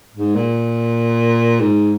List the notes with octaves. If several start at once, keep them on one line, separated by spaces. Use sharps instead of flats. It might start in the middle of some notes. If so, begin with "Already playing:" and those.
G#2
A#2
G#2